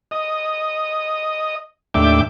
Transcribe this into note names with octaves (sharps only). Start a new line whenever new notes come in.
D#5
D#2 A2 D4 E5 G5 D6